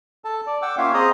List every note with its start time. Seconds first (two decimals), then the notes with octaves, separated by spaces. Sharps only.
0.25 A4 A5
0.46 D5
0.62 F#5 G5 D6 E6
0.78 A#3 C#4 F4 C#5 E5 F5
0.94 C4 G#4 C5 D#5 A#5 D#6